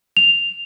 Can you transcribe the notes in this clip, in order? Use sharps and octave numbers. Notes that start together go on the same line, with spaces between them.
F7